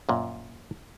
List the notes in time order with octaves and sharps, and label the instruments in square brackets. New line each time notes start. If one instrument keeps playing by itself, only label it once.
[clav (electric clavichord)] F#2 A#2